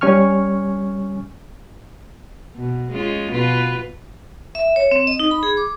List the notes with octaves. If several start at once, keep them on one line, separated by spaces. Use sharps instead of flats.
G3 C#4 G#5 C#6 F6
B2
G#3 C#4 F4
B2 F4 B4
E5
C#5
C4
D#5
D#4
B5
G#4
D6